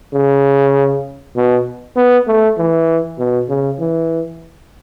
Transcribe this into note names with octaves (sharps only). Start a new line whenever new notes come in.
C#3
B2
B3
A3
E3
B2
C#3
E3